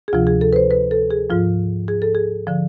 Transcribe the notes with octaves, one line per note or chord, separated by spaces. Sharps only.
G#4
D2 C3 F3 F4
G#4
A4
B4
C5
B4
A4
G#4
G#2 F3 F4
G#4
A4
G#4
D3 F3